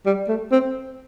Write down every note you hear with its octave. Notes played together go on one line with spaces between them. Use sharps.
G3
A3
C4